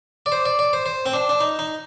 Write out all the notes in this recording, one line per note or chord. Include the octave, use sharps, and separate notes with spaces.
D5
C5
D5
D5
C5
C5
C4
D4
D4
D#4
D#4